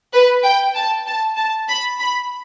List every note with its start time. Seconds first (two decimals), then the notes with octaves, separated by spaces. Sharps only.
0.13 B4
0.43 G5
0.75 A5
1.06 A5
1.37 A5
1.68 B5
1.99 B5